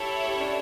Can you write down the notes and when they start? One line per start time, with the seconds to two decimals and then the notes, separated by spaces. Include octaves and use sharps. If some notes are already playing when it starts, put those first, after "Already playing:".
Already playing: E4 G4 A4 C#5
0.26 G4
0.36 C#4
0.41 D4